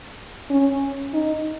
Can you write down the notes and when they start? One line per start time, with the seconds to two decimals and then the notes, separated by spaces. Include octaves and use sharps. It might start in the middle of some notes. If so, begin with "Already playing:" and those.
0.50 C#4
1.13 D#4